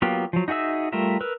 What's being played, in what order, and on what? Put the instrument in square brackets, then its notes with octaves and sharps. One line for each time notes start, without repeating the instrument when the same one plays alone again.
[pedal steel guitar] F#3 A#3 B3 F4 G4
F3 F#3
D#4 F#4 G#4 E5 E6
G3 A3 F4 A#4 E5
A#4 B4 E6